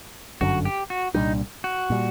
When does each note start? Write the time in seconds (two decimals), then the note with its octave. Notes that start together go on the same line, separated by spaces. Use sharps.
0.41 G1 F#2 D3 F#4
0.65 G4
0.90 F#4
1.14 C2 A#2 G3 D4 D#4
1.64 F#4
1.90 A#2 G3